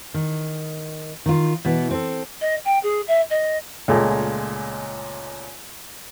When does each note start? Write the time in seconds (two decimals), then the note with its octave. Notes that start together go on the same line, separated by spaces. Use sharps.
0.14 D#3
1.26 D#3 F4
1.65 B2 E3 B3
1.91 C4 A4
2.41 D#5
2.65 G5
2.83 G#4
3.07 E5
3.30 D#5
3.88 C#2 A#2 G#3 A3